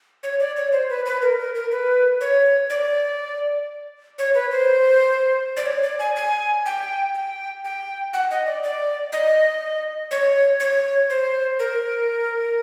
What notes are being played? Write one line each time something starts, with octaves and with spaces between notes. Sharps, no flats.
C#5
D5
C#5
C5
B4
B4
A#4
A#4
A#4
B4
C#5
D5
C#5
B4
C5
D5
C#5
D5
G#5
G#5
G5
G5
G5
F#5
D#5
D5
D5
D#5
C#5
C#5
C5
A#4